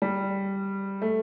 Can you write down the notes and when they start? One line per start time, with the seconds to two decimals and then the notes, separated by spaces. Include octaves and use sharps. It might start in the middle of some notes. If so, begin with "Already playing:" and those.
0.02 G3
1.02 A3